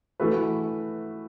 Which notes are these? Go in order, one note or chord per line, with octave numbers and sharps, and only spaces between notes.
E3 A3 F#4 B4